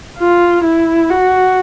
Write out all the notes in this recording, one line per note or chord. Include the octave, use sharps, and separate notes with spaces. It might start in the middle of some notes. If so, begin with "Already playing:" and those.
F4
E4
F#4